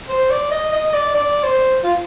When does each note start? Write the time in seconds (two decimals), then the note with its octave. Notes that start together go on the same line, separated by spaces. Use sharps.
0.09 C5
0.30 D5
0.51 D#5
0.73 D#5
0.94 D5
1.15 D5
1.44 C5
1.84 F4